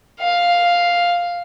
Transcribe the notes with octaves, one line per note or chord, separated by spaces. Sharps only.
F5